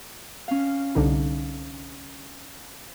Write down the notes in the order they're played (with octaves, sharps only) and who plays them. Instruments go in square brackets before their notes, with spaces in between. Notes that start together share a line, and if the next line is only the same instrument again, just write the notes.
[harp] C#4 F5
[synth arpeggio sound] C2 D3 D#4